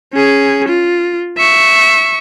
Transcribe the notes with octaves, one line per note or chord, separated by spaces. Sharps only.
C#4 G#4
F4
E5 C#6